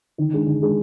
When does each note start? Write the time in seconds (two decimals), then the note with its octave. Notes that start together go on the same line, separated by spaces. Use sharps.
0.18 D#3
0.33 G#3 D4 G#4
0.47 D#3
0.62 G#3 D4 G#4